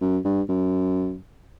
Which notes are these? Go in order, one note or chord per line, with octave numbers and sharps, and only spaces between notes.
F#2
G2
F#2